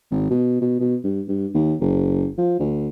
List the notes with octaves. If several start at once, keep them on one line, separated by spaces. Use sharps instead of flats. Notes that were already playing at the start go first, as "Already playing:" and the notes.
G#1
B2
B2
B2
G2
G2
D#2
F#1
F3
D2